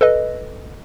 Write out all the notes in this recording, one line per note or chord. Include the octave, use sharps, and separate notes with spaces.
A4 B4 D#5